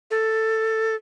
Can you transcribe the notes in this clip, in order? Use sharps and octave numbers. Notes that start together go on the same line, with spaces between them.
A4